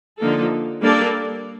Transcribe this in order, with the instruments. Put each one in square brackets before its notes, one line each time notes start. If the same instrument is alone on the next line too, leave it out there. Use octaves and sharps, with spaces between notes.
[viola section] D3 F3 A#3 D#4 A4
G3 A#3 D4 A4 D5